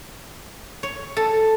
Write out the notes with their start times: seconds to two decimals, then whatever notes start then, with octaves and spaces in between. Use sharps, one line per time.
0.83 C#5
1.17 A4